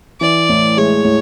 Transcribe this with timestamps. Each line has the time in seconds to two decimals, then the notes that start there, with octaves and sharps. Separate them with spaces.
0.21 E3 D5
0.49 A2
0.77 G#3 C#5
1.05 A2